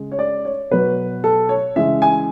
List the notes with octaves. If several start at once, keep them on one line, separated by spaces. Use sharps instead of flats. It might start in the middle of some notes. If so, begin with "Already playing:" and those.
Already playing: C#3 G#3
C#5
D5
C#5
B2 F#3 B4
A4
C#5
C#3 E3 G#3 E5
G#5